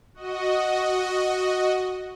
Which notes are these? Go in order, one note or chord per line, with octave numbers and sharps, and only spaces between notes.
F#4 D#5